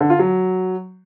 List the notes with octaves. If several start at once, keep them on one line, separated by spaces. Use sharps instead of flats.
D3
F4
F#3